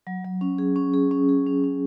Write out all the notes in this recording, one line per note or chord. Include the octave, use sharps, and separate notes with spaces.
F#3
F#3
C#4
G#4
C#4
G#4
C#4
G#4
C#4
C#4